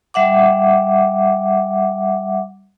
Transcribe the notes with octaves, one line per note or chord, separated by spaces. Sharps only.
G3 E5 F#5 D6